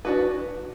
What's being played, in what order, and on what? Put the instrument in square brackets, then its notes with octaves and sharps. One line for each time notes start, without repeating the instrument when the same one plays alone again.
[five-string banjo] D4 F#4 B4